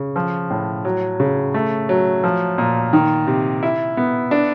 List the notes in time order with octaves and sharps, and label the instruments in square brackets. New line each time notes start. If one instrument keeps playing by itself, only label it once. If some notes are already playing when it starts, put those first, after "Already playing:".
Already playing: [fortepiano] C#3
F3
A2
F#3
C#3
A3
F#3
F3
A#2
D#3
C3
E4
B3
D4